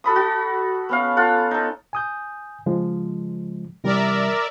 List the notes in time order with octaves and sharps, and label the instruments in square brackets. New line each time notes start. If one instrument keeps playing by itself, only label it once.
[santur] F#4 A4 B5 D#6
F#4
B3 C#4 F5
F4 A4 F5 F#5
D#4 A4
[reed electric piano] G#5 D#6 G6
C#3 F3 G#3
[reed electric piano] C3 E3 G3 [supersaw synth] A#4 D5 E5